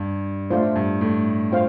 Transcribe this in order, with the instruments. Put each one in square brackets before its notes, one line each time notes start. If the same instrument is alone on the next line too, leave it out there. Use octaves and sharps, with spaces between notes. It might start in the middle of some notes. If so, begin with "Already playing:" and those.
Already playing: [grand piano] G2
[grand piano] A2 [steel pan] A3 D4 F4 C5
[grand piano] G2
A2
[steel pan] C4 F4 C5 F5